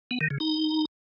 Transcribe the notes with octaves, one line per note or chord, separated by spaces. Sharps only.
B3
D#3
C#3
D#4